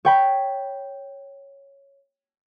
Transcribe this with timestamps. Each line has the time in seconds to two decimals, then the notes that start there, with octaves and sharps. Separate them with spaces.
0.05 C#5 G5 B5